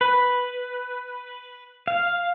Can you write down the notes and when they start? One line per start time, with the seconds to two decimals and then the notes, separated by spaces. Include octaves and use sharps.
0.01 B4
1.88 F5